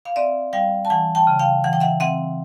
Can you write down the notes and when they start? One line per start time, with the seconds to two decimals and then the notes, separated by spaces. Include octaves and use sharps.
0.05 F5
0.16 C4 D5 E5
0.53 G3 F5 G5
0.85 A5
0.90 E3 F#5 G#5
1.15 G5 A5
1.27 C#3
1.39 F5 G5
1.64 E3 F#5
1.73 G5
1.80 E5 F#5
2.00 C4 E5 F#5